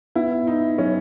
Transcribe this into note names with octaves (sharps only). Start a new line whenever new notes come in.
B3 E4
D#4 E4
F#3 C#4